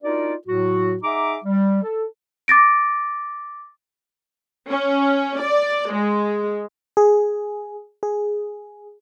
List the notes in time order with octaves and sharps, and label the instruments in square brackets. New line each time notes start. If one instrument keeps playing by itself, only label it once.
[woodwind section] D4 D#4 F4 F#4 A#4 D5
A2 F#3 F#4
D#4 G#4 E5 F#5 A#5 D6
G3
A4
[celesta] D6 A6 A#6 D7
[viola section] C#4
D5
G#3
[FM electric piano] G#4
G#4